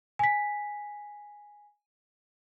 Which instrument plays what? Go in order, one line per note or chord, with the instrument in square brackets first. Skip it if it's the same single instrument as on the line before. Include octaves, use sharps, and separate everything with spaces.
[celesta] G#5 B6